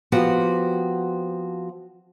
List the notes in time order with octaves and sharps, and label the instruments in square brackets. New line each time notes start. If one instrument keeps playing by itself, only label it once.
[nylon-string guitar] F3 B3 C4 F#4 G4